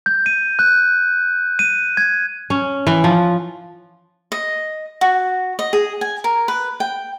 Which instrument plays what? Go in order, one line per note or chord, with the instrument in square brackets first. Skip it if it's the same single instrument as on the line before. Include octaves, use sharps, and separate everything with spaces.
[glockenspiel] G6
D#7
F#6
D#7
G#6
[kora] C#4
E3
F3
[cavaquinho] D#5
F#4
D#5
G#4
G#5
A#4
B4
G5